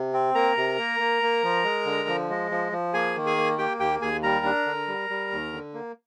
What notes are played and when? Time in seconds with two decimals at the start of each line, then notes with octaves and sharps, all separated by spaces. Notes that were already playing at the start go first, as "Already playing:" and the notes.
Already playing: C3
0.13 C4
0.35 A#3 A#4 A#5
0.57 C3
0.78 A#3
1.00 A#3
1.22 A#3
1.44 F3
1.64 G#3
1.86 D3
2.08 F3
2.30 G#3
2.51 F3
2.72 F3
2.94 A#3 G#4 G#5
3.16 D#3
3.26 G#4 G#5
3.37 A#3
3.58 A#3 G4 G5
3.80 D#2 G4 G5
4.01 D#2 G#4 G#5
4.23 G3 A#4 A#5
4.45 D4
4.66 D3
4.88 G3
5.10 G3
5.31 D#2
5.53 D3
5.74 A#3